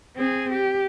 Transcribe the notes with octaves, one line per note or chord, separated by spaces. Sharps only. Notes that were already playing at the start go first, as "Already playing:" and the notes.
C4 G#4
G4